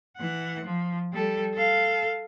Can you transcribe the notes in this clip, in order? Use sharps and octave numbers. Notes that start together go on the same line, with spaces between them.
E3 F#5
F3
G3 A4
A4 F5